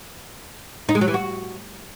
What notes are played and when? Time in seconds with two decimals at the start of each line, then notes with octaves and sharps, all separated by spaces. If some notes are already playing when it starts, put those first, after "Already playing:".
0.89 D#4
0.95 G#3
1.01 F#3
1.08 E3
1.14 F#4